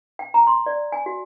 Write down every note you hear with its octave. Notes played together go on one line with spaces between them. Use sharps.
G5
A#5
C6
D5
G#5
F#4